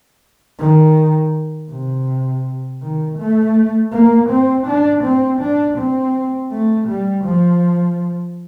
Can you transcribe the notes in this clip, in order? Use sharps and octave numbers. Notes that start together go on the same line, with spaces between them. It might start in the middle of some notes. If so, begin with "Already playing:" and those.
D#3
C3
D#3
A3
A#3
C4
D4
C4
D4
C4
A3
G3
F3